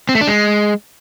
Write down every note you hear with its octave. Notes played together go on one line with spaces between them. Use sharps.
C4
A3
D4
G#3